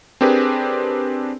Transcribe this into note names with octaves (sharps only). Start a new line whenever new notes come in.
C4 D4 G4 G#4 A#4 B4